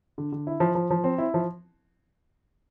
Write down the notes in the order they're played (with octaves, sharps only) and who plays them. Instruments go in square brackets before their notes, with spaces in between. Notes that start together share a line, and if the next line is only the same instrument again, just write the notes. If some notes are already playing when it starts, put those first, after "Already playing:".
[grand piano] D3
D3
E4
F3
F3
F3
C4
E4
F3